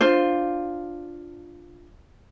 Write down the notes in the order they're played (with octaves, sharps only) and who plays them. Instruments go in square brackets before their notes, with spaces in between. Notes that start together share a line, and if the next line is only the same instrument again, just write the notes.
[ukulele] D4 F4 C5